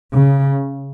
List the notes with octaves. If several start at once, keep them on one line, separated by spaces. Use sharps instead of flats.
C#3